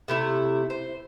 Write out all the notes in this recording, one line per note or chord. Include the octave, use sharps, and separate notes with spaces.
C3 A3 E4
C5